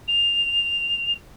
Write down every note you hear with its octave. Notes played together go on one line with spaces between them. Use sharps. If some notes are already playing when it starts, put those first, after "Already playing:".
F7